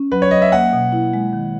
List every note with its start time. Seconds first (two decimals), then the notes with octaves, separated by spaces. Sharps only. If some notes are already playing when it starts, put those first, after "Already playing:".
Already playing: C#4
0.12 F#3 B4
0.22 C#5
0.31 F#3 D#5
0.42 E5
0.52 A#3 F#5
0.73 B2
0.92 E4
1.13 G#3
1.33 D#3